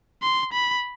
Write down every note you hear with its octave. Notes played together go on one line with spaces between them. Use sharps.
C6
B5